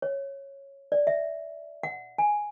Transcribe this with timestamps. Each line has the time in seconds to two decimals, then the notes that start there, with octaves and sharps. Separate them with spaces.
0.02 C#5
0.92 D5
1.07 E5
1.83 F#5
2.18 G#5